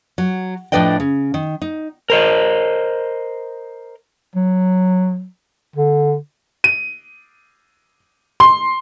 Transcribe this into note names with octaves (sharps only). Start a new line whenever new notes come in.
F#3
A2 F3 D4 B4 D#5 G5
C#3
D#3
D#4
A#4 C5 D#5
F#3
D3
D#7
C6